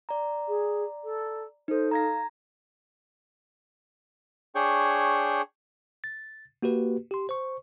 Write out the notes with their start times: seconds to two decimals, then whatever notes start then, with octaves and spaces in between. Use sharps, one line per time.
0.09 D5 A#5
0.47 G#4
1.03 A4
1.68 D#4 A4 C5
1.91 F5 A#5 G#6 A#6
4.55 D4 G#4 C#5 G5 C#6
6.04 A6
6.63 A#3 F#4 G4 B4
7.11 G4 C6
7.29 C5 C#6